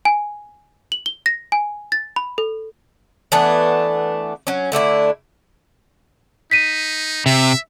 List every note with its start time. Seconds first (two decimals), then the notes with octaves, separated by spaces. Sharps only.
0.05 G#5
0.92 F#7
1.06 G7
1.26 A#6
1.52 G#5
1.92 A6
2.16 B5
2.38 A4
3.32 E3 A3 B3 D4
4.47 F#3 C#4
4.72 D3 A3 D4 E4
6.51 D#4 B6 D#7
7.26 C3 E5